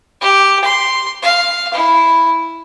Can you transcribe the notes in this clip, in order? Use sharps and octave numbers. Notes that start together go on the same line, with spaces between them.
G4
C6
F5
E4